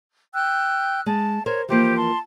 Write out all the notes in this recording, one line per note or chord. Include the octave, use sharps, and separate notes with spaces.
G5 E6 F#6
G#3 A5
A#4 C5 C#5
E3 F3 A#3 G4 C5
A5 C6